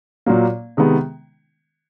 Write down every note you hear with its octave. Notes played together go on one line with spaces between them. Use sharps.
A#2 F#3 A#3
C3 D#3 G#3 B3